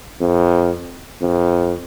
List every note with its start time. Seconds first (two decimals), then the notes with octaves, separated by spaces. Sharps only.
0.21 F2
1.21 F2